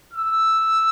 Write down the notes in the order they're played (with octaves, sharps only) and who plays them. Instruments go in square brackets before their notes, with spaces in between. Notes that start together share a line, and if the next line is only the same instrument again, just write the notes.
[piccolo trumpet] E6